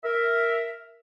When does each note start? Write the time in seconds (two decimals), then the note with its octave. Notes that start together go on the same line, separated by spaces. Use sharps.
0.04 A#4 E5